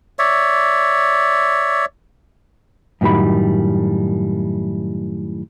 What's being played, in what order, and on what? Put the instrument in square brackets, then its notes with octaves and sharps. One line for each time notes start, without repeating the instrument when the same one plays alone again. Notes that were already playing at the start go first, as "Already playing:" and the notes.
[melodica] C#5 D5 E5
[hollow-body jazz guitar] F#2 A2 D#3 G3 B5